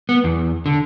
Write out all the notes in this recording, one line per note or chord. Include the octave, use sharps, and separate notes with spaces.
B3
E2
D3